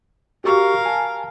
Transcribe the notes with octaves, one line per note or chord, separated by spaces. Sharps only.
F#4 G4 A#4 F5 C#6
G#5 A5